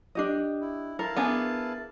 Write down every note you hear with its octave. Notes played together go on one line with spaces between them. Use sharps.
D4 G4 D#5
E4
E4 A#4 F5 A5
B3 D4 G#4